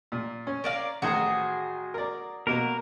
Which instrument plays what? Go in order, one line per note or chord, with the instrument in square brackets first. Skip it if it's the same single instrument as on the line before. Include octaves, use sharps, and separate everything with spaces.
[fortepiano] A#2
C#4
[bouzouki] A#4 D5 F5
[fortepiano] A1 D#3 A#5 [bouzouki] F#4 G#4 C5
[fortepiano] A#4 D5
[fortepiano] B2 A#3 [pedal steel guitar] A#4